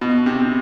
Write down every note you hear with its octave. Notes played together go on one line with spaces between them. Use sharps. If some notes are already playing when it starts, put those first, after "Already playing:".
B2
C3
C3